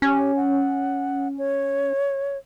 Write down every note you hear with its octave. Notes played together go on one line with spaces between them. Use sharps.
C#4 G4
F#5
C#5